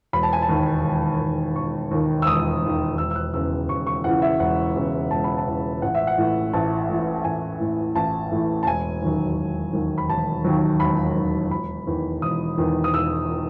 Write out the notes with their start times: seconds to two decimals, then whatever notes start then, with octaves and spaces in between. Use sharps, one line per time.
0.13 E1 B5
0.23 A5
0.33 G#5
0.42 A5
0.49 D#2 D#3
0.84 E1
1.20 D#2 D#3
1.56 E1 C#6
1.91 D#2 D#3
2.22 E6
2.27 E1 D#6
2.62 D#2 D#3
2.98 E1 E6
3.11 E6
3.15 F#6
3.34 E2 C#3 E3 E6
3.69 E1 C#6
3.87 C#6
4.04 E2 C#3 E3 F#5
4.22 E5
4.40 E1 F#5
4.75 E2 C#3 E3
5.11 E1 A5
5.24 B5
5.37 A5
5.46 E2 C#3 E3
5.82 A1 F#5
5.95 E5
6.07 F#5
6.18 A2 E3
6.53 A1 A5
6.89 A2 E3
7.15 A5
7.24 A1 G#5
7.60 A2 E3
7.95 A1 A5
8.32 A2 E3
8.63 A5
8.67 E1 G#5
9.02 D#2 D#3 F#3
9.38 E1
9.73 D#2 D#3 F#3
9.98 B5
10.09 E1 A5
10.44 D#2 D#3 F#3
10.80 E1 B5
11.16 D#2 D#3 F#3
11.51 E1 B5
11.87 E2 D#3
12.22 E1 D#6
12.58 E2 D#3
12.84 D#6
12.93 E1 E6
13.30 D#3